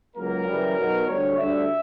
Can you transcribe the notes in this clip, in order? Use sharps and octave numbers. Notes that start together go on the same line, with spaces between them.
C#2 C#3 F#3 A#3 A#4
F#2 C#3 E3 G3
B1 B2 F#3
D2 D3 G3 C#5
D2 D3 G3 E5